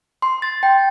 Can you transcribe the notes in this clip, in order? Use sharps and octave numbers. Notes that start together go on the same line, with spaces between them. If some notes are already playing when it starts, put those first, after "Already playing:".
C6
A6
G5